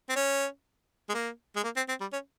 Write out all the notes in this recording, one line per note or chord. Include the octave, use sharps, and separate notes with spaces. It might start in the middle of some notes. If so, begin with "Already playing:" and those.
C4
C#4
G#3
A#3
G#3
A#3
C4
C4
G3
C#4